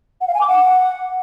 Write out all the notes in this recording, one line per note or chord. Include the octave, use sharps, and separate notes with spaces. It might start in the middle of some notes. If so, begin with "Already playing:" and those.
F#5
F5
G#5
D6
F#5